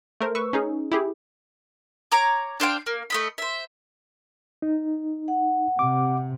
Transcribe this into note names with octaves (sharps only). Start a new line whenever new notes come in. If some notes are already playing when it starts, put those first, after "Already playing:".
A3 A#4 C5
B4 C#6 E6
C#4 D#4 G#4
E4 G4 G#4
C#5 A#5 D6
D4 C5 F5 G5
A#3
A3 D#5 B5
C5 E5
D#4
F#5
C3 D6